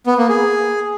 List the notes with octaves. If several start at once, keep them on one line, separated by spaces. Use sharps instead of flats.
B3
A#3
G#4